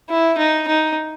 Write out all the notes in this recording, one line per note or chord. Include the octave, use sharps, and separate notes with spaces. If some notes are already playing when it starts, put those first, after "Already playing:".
E4
D#4
D#4